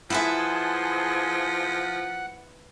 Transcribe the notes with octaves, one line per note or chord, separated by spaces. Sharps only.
F3 E4 G#4 B4 E5 F#5 A5 C6